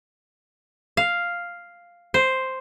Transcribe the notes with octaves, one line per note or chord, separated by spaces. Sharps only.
F5
C5